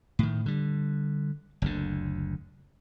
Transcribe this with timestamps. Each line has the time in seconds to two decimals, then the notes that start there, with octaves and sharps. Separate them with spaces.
0.19 A2 D#3
0.46 D3 G3
1.62 F#1 D2 D3